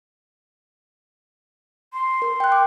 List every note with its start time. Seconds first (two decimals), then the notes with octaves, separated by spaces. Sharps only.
1.93 C6
2.22 A#4
2.40 G5 F#6
2.52 D6